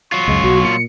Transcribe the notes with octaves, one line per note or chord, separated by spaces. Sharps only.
F#3 F4 C#6
C#2 F#2 G#3
B1 F#4
A#2 C#7